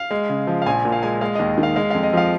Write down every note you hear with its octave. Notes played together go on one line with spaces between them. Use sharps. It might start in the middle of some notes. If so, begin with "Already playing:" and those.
Already playing: F5
G#3
C#3
F3
F5
A#1 G#5
A#2
F5
G#3 G#5
G#3 F5
D#2 D#5
D#3
F5
G#3 F5
F2 F5
D#5
F3 F5